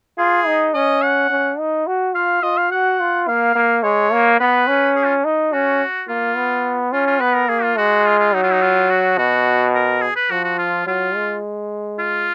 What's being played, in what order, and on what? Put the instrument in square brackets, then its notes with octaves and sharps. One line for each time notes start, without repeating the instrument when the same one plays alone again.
[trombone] F4 [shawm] G#4
[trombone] D#4
[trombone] C#4 [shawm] D#5
[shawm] F#5
[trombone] C#4
D#4
F#4
[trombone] F4 [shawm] F5
[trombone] F4 [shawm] D#5
[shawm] F5
[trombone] F#4 [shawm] F#5
[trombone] F4
[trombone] A#3 [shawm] F5
[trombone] A#3
[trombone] G#3 [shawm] C#5
[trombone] A#3
[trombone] B3 [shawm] B4
[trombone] C#4
[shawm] G#4
F4
[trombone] D#4
[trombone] C#4 [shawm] F#4
[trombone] A#3 [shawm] F4
[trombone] B3
[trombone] C#4 [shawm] F4
[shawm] F4
[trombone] B3 [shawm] B4
[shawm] A#4
[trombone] A#3 [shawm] G#4
[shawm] F4
[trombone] G#3 [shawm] F#4
[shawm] F4
F4
[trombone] F#3 [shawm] D#4
[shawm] F4
D#4
F4
F#4
[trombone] B2 [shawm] F#4
[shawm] A#4
G#4
B4
[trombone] F3 [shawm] F#4
[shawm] F#4
F4
[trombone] F#3 [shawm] F4
[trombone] G#3
[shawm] F4